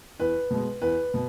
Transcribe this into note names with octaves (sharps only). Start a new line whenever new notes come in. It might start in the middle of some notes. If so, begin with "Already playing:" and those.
E2 B4
B2 G#3
E2 B4
B2